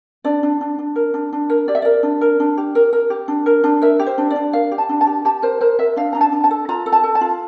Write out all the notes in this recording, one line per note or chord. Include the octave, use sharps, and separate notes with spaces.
D4 D5
D4
D4
D4
A#4
D4
D4
A#4
G4 D5
E5
A#4 D5
D4
A#4
D4
G4
A#4
A#4
G4
D4
A#4
D4
A#4 E5
G4
C5
D4
D5
D4
A#4 F5
G4
A5
D4
A5
G4
G4 A5
A#4 C5
A#4 C5
A#4 E5
D4 F5
D4 A#5
A5
D4
A5
A4
F4 A#5
A4
A5
A4
A5
F4